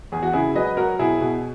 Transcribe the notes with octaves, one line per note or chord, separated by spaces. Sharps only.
E2 G#4
F#4
C#3 E4 G#4
F#3 B4 D#5
F#3 F#4 A#4
B2 E4 G#4
B2